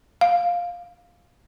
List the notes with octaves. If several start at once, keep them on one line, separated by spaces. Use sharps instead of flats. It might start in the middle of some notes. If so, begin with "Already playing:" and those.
F5